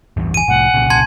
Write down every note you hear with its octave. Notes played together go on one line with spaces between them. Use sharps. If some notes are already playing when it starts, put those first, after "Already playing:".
A1 E2 G2
G#5 D#7
C2 A2 F#5
C2 A#2 C#3
A5 C6 G#6